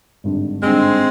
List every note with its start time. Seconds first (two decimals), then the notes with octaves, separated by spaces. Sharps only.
0.24 G#1 G2 D3
0.63 G#1 G2 D3 G#3 C4